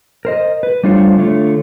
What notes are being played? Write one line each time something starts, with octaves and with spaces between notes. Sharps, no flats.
A#4 C5 D#5
B4
G3 A3 D4 F4 C5 C#5
D3 A3 F4 C#5